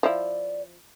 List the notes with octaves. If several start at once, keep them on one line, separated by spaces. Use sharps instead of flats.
F3 E4 D5